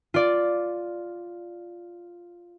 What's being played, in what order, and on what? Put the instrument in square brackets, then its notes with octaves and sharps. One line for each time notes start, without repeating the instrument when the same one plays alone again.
[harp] F4 D5